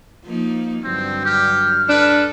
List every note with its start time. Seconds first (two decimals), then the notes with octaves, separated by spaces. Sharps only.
0.25 F3 A#3 D#4
0.84 G2 D3 F#3 C4
1.25 G4 F6
1.89 D4 A4 B4